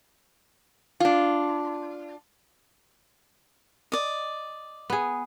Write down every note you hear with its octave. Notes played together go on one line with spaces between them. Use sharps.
D4 F4
D5 D#5
B3 G#4